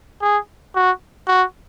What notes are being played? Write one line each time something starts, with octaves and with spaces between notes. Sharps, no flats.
G#4
F#4
F#4